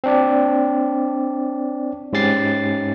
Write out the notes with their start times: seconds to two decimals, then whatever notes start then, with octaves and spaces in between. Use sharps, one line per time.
0.04 C4 D4 D5
2.13 G#2 C#4 G4 A6 C7